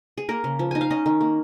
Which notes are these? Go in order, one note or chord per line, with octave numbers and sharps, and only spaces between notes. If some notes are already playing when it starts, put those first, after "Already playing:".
G#4
A#3 A#4
C#3
F3
D#4 G#5
F5
C#4 D#5
D#3
A#3